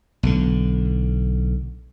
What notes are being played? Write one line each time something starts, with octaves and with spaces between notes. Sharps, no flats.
B1 D3